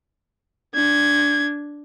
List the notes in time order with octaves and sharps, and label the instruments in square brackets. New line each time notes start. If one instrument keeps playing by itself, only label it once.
[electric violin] D4 G#6